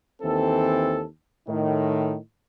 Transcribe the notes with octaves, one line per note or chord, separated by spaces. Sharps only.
D#2 E3 C4 A4
A2 D#3